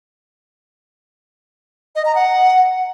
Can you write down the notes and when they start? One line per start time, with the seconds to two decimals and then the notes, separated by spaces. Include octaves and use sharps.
1.95 D#5
2.05 A#5
2.15 F#5